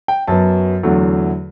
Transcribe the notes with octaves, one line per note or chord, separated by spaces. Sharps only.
G5
F#2 F#3 B3 A5
E2 D3 F#3 A3